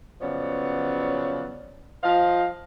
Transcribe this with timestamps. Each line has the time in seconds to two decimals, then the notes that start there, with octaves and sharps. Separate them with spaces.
0.21 C#3 F3 F#3 B3 C#5 D5
2.03 F3 C5 D#5 F5